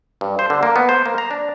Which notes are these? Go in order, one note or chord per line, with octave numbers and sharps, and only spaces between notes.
G2
C5
D3
A#3
B3
C5
A#3
A#5
D4